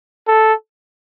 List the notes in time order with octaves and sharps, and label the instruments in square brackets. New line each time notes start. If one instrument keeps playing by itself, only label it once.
[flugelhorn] A4